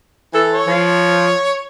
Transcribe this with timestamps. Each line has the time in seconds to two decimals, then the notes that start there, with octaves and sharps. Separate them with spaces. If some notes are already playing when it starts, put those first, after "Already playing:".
0.34 E3 A4
0.53 C#5
0.67 F3